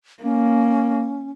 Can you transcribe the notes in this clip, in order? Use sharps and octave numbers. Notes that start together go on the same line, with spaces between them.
A#3 C#4